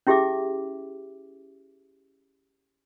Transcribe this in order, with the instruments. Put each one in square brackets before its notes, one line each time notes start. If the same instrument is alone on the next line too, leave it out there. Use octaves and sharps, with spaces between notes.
[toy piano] C#4 E4 G4 G#4 E5 D6